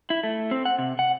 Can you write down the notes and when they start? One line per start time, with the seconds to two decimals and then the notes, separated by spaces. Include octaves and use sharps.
0.10 E4
0.23 A3
0.51 C4
0.65 F#5
0.79 C3
0.99 F#5